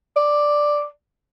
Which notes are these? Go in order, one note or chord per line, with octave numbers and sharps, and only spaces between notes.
D5